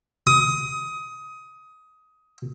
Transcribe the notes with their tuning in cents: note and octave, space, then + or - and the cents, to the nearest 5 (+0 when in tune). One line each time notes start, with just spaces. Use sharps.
D#6 +20